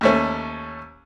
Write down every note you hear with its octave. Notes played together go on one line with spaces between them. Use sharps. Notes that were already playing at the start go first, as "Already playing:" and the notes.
D#2 A3 C#4